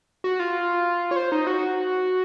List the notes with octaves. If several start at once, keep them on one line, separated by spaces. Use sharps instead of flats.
F#4
F4
C#5
C5
D#4
F#4